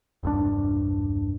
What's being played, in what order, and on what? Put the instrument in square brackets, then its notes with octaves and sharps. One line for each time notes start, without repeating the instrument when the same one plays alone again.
[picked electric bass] E1 C2 G2 D4